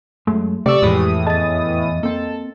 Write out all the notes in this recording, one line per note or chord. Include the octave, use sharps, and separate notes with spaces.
F#2 G#3 A3
C3 A3 G4 D5 C#6 E6
F2 A2 E3 G#3 D#6
E2 G#4 D#5 A5 A6
A#3 C4 A4